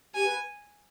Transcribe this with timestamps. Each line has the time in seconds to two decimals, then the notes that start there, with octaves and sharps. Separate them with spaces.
0.14 G4 G#5
0.25 B4